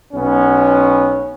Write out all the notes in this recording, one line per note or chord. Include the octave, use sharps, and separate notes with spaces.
B1 B3 C#4